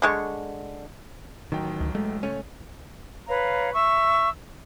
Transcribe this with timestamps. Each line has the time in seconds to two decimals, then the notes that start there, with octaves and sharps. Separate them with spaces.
0.02 D3 G#3 C#6
1.52 A1 D#3 F#3 G5
1.81 D2
1.95 G#3 A3
2.23 C#2 A3 C#4 C#5
3.28 B4 C#5 F5 A#5
3.73 E5 C#6 E6